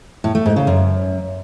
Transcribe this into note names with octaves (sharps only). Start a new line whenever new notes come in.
A2
A3
G#2
C#3
F#2